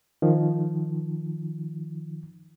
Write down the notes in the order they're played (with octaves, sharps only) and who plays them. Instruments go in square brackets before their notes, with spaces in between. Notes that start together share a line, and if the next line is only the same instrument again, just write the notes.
[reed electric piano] D#3 F3